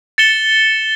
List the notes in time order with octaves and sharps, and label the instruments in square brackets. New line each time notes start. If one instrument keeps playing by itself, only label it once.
[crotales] A6 C#7 E7 G7